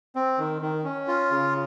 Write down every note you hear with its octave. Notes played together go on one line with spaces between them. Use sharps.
C4
D#3
D#3
C#4
F4
C#3